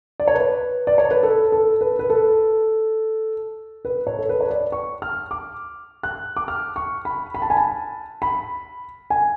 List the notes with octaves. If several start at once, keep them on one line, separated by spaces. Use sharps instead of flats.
D5
C#5
B4
D5
C#5
B4
A4
A4
B4
B4
A4
B4
C#5
A4
B4
C#5
D5
C#6
F6
D6
F#6
D6
F6
C#6
B5
B5
A5
G#5
A5
B5
G#5